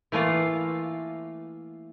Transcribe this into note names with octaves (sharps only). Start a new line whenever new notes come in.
E3 A3 A#3 F4